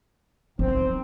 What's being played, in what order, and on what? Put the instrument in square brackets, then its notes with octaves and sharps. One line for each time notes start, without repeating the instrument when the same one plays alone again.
[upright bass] D#3 [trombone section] C4